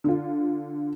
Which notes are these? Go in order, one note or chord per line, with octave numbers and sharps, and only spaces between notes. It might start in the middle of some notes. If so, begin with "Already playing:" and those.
D3 F4